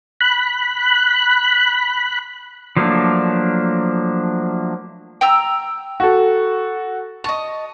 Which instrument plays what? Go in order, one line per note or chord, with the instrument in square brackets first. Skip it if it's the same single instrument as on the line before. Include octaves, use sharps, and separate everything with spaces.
[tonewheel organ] B5 F#6
[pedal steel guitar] F3 F#3 A3 A#3 D4
[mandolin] G5 A#5 E6
[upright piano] F#4 A4
[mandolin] D#5 A5 [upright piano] C#6